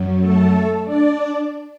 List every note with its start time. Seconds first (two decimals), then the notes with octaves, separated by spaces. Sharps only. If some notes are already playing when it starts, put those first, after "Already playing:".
Already playing: F#2 F#3
0.20 A3 A4
0.84 D4 D5